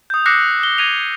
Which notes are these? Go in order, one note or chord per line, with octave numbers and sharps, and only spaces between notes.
D#6 G6
D6 E6 F#6 A#6 C7 C#7
D#6 G7
G#6 A#6 D#7 F7
D#7